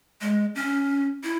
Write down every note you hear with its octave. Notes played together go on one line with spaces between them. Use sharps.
G#3
C#4
E4